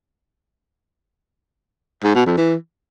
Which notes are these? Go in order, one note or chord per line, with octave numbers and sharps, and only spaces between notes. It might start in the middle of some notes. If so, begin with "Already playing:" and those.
G#2
B2
F2
E3